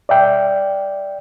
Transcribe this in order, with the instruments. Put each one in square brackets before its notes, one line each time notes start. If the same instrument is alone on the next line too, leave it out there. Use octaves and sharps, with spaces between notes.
[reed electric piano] D5 E5 G5